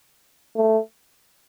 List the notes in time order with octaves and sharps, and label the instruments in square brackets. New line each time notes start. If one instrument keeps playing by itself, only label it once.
[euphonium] A3